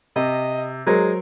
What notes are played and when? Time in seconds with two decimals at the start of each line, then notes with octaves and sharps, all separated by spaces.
0.16 C3 D#5
0.87 F#3 G#3 A#4 C5